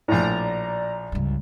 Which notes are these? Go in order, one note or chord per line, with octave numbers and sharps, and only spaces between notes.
A#1 A2 D5 A#5
C#2 G2